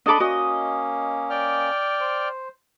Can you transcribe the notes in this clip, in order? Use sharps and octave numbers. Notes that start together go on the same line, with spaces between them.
D4 A4 D#5 B5 D6
A#3 C#4 F#4 D#5
D5 G5 F6
C5